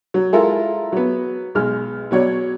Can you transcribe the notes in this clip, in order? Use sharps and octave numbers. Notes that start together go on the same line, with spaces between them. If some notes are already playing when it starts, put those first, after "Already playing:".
F#3
G#3 E4 F4 A4 A#4
F#3 B3
B1 G#3 F6
B2 F#3 C#5 D5